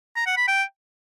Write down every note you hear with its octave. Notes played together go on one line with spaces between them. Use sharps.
A#5
F#5
B5
G5